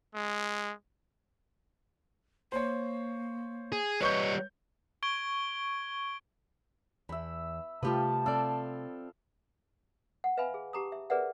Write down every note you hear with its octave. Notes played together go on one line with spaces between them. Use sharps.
G#3
A#3 C5 C#5
G#4
G3 B4 C#5 D#5 C#6 G6
C#6 G#6 D7 G7
E2 E5 B5
C3 F3 G3 A3 F4 G4 B4 A5
C4 A4 D5 F5
F#5
B4 E5 F5 G#5 B5
G#4
G4 A5 A#5 D6 D#6
E5
G#4 A#4 B4 D5 E5 F#5